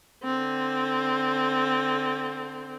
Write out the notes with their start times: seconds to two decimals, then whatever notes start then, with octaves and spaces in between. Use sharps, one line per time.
0.24 D3 C4